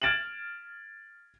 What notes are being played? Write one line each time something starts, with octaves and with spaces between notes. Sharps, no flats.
F6 G#6 A6 D7 E7 F#7